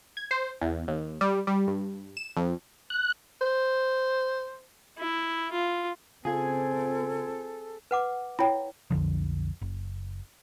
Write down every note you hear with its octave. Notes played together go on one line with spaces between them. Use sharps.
G#6
C5
E2
D#2
G3
G3
G2
E7
F2
F#6
C5
E4
F4
C#3 C4 F4 G#4 A4 G#6
B4 F#5 D6
E4 C#5 G5 B5
B1 F2 D3 F3
F#1